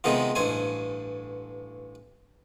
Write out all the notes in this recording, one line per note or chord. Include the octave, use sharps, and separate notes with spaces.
C3 D#3 G#3 B3 F4
A1 G2 C5 G#5